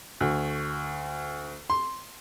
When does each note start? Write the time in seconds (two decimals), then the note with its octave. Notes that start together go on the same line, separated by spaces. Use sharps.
0.21 D2
1.70 C6